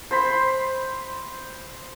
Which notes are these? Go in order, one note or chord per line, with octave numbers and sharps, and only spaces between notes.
C5 B5